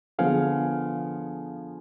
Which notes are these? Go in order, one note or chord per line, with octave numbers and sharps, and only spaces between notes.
D3 F3 B3 F4 G#4 F5 G#5